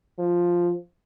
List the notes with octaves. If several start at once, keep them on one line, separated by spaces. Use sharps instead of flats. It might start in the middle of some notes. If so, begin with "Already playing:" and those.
F3